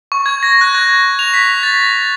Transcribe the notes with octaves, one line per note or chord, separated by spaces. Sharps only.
C#6
G#6
A#6
F#6
G#6
F7
B6
A6